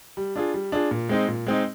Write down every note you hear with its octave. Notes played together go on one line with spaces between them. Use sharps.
G3
D4 F4 G#4
G3
D4 F4 G#4
A#2
G#3 C4 D#4
A#2
G#3 C4 D#4